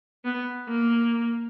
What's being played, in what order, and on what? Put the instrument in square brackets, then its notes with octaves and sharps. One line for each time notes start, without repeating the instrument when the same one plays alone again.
[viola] B3
A#3